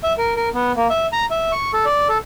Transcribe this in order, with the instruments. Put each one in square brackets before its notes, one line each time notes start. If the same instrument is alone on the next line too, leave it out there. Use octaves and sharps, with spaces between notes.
[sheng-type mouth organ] E5
A#4
A#4
B3
A#3
E5
A#5
E5
C#6
A4
D5
A4